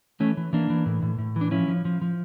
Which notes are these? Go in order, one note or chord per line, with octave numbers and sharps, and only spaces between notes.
E3 A3 C#4
E3
E3 A#3 D4
E3
A2
A2
A2
E3
D4
F3 C#4 E4
F3
F3
F3